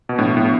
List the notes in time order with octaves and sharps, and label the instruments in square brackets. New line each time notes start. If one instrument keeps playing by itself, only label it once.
[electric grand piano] B2
[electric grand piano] A2 [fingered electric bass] F3 B3 D4
[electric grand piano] A2